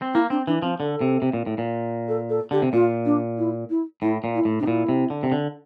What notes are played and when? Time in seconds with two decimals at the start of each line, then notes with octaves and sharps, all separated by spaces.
0.02 C4
0.14 A#3 E4
0.30 C4 D4
0.47 E3 D4
0.62 F3 C4
0.80 D3 A4
1.01 C3
1.22 C3
1.33 A#2
1.46 A2
1.58 A#2
2.08 A4
2.30 A4
2.51 D3 G4
2.62 C3
2.73 A#2 F4
3.05 D4
3.38 E4
3.70 E4
4.02 A2 E4
4.24 A#2
4.35 E4
4.45 A2
4.59 D4
4.63 C3
4.67 A#2 E4
4.89 C3
5.10 D3
5.23 C3
5.32 D3